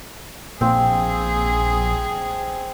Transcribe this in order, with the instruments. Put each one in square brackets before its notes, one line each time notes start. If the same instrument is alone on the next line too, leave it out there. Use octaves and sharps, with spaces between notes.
[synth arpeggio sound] A#1 [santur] C4 F5 [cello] G#4